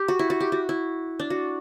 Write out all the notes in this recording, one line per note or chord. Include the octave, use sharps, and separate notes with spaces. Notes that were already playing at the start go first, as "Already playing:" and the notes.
Already playing: G4
F#4
E4
F#4
G4
F#4
E4
D4
F#4